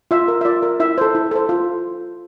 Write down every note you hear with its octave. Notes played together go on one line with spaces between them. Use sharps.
F4 E5
A#4
E5
F4 D5
A#4
E4 E5
A4 C5
E4
A4 C5
F4